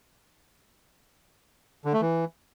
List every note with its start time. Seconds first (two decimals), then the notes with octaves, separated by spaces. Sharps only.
1.85 D3
1.93 A3
2.01 E3